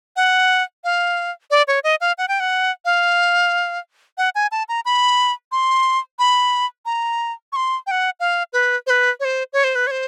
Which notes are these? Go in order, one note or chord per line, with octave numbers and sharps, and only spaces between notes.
F#5
F5
D5
C#5
D#5
F5
F#5
G5
F#5
F5
F#5
G#5
A5
A#5
B5
C6
B5
A#5
C#6
C6
G5
F#5
F5
B4
C5
B4
C#5
C5
C#5
C5
B4
C#5
C5